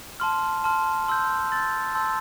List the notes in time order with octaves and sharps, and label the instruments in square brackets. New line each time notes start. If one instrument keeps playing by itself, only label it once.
[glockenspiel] A5 C6 F6
A5 C6 F6
C6 E6 G6
C6 E6 G6 A6
A5 C6 E6 G6